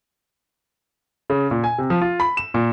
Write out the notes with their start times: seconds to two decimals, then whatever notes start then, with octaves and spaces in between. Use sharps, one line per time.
1.30 C#3
1.51 A#2
1.64 G#5
1.78 C3
1.90 F3
2.02 F4
2.20 B5
2.37 E7
2.54 A#2